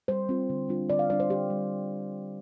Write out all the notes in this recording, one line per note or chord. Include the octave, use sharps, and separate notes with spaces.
G3 C5
C4 F4
D3
G3 D4 F4
D3 D5
F5
G3 D4 F4 D5
C5
D3 G4
G3